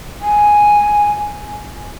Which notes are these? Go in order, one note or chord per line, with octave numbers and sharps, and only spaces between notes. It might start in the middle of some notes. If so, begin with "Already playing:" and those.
G#5